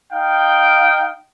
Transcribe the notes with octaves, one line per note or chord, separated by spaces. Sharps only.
D#4 F5 G5